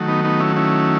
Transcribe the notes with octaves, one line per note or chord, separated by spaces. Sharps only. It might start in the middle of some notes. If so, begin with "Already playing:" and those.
Already playing: D#3 F#3 A3
B3 D#4
B3 D#4
C#4 E4
C#4 E4